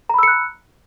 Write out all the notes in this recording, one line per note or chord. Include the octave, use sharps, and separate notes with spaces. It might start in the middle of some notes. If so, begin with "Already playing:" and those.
A#5 B5 E6 F#6 C#7